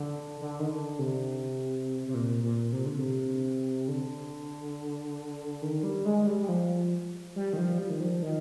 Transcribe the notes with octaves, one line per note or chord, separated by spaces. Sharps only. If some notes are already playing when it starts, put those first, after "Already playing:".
Already playing: D3
D3
D#3
D3
C3
C3
A#2
A#2
C3
D3
C3
D3
D#3
G3
G#3
G3
G3
F3
G3
D#3
F3
G3
D#3
F3
D#3